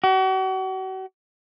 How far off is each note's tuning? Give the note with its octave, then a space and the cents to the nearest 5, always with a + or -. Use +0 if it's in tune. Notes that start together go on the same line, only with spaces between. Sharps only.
F#4 +40